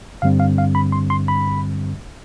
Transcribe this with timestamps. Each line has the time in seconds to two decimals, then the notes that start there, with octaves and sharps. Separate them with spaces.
0.22 G2 D3 G3 C4 F5
0.40 F5
0.58 F5
0.75 B5
0.92 C6
1.10 C6
1.28 B5